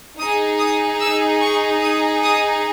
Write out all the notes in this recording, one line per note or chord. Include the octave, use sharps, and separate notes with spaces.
D#4 G#4 D#6
D#6
E6
C#6
D#6
D#6